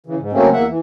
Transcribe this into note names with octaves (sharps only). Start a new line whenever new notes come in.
C#3 E3
G#2
C#3 F#3 A3 A#3 C4 C#4
E2 A#3 E5 F#5
E3